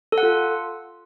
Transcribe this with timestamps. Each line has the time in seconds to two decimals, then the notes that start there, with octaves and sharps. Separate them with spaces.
0.12 A4
0.18 F#5
0.23 F4